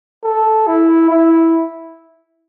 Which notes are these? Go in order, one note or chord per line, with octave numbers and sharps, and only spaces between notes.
A4
E4
E4